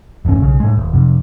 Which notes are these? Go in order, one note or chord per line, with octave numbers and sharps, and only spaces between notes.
F#1 E2 A2 C#4
B1 C#3
A2 G#3
D#1
F2 C3